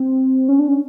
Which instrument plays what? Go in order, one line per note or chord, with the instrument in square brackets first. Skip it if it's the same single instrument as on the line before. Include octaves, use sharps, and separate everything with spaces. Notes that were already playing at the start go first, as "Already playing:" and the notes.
Already playing: [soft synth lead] C4
C#4
D4
C#4